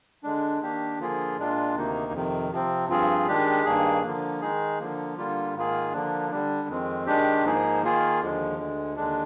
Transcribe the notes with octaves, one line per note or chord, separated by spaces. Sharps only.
D3 G#3 D4
D#3 A#3 D4 G4
D3 F3 A#3 F4 G#4
A#2 G#3 D4 F4
D2 C3 D#3 A#3 D#4
F2 C3 D#3
C3 F3 C4
G2 F3 C4 F4 G#4
D#3 G#3 D4 G4
G2 D#3 A#3 D4 G#4
D3 F3 A#3
D#3 G#3 D#4 G#4
D3 F3 A#3
D3 G3 A#3 F4
G#2 D#3 A#3 F4 G#4
D3 F3 A#3 D4
D3 G3 D4
F2 D#3 G#3 C4
D#3 G#3 D4 G4
G#2 F3 A#3 D#4 G#4
D#3 A#3 F4 G#4
D#2 D3 F3 G#3
D2 D3 G#3
D#2 D3 G#3 D4